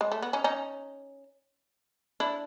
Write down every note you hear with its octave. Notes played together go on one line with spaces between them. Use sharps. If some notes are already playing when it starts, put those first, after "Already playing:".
G#3
A3
B3
C#4 D#4
C#4 D#4
D4 E4